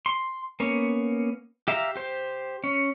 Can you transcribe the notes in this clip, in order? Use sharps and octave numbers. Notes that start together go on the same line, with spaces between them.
C6
A#3 B3 C#4
G4 E5 F5 A#5
G4 C5
C#4